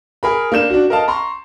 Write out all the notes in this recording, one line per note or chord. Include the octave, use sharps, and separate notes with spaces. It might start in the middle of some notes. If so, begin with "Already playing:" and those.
G#4 A#4 B5
A#3 D4 G6 E7
D4 F#4
A#4 D#5 F5 A5
A#5 C6 C#6